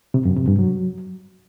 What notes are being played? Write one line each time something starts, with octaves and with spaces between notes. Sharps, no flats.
C3
F#2
C3
G2
F#3